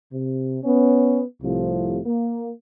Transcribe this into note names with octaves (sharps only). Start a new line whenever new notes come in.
C3
B3 C#4
C2 A2 C3 F3
A#3